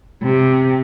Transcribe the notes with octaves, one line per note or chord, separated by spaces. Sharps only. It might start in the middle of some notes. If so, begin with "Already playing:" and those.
C3